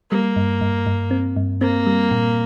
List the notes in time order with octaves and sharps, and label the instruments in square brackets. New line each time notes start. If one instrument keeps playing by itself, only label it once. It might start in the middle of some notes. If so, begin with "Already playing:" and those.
[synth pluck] G3 [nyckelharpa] A#3
[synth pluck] G2
G2
G2
C4
G2
[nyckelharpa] A#3 [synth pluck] C4
[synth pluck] G3
A#2